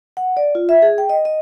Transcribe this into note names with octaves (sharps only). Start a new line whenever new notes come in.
F#5
D5
F4
E5
G#4
G5
D#5
D#5